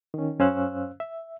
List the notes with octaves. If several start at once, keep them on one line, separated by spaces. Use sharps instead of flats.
D#3 C#4
F#2 C#4 C5 F5 E6 F#6
E5